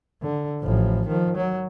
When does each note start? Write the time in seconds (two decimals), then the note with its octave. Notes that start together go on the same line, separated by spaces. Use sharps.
0.22 D3
0.61 A1 F3
1.08 D#3 F3
1.36 F#3